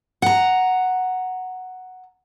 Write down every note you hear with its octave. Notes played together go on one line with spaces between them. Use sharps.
F#5 A#5